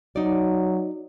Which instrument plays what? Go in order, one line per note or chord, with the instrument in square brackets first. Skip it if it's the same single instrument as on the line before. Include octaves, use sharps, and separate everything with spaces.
[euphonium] F#3 [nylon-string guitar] D#4 D5